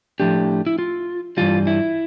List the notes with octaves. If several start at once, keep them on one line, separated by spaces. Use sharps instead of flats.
A2 F3 A3 D4 G4
E4
F4
G2 E3 G3 F4
E4